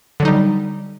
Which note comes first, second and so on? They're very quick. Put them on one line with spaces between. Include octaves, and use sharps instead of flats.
D3 F#3 D#4 G3